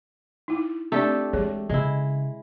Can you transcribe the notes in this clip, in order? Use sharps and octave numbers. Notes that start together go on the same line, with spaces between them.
D#4 E4
A3 C4 D4 G4 A4 D5
E3 G#3 G#4 C#5
C#3 G#3 E4